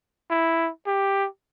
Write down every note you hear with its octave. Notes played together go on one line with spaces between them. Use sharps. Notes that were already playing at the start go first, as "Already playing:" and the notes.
E4
G4